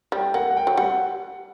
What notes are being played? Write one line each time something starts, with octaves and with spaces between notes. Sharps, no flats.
G3 G5
A#3 F#5
F#5
G5
F#3
G3 F#5